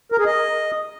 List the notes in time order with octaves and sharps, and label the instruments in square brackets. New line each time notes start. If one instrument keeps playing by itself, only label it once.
[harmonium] A#4
G#4
D#5